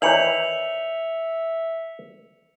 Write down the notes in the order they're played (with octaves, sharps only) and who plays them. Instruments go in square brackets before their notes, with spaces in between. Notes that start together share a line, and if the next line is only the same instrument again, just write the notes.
[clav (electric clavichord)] D#3 E3 [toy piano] C#5 D5 [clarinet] E5 [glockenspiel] C#7 F7 F#7